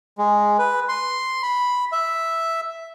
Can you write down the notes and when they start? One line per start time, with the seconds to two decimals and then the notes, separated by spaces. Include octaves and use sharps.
0.18 G#3
0.59 B4
0.89 C6
1.43 B5
1.92 E5